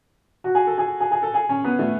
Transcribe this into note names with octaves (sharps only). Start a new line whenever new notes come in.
F#4
G#4
A4
G#4
G#4
G#4
A4
G#4
C#4
B3
A3